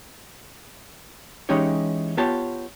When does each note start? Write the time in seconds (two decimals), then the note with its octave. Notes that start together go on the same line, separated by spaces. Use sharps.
1.49 E3 G#3 C#4 D#4 G4 C#5
2.17 B3 F4 G4 C#5 A5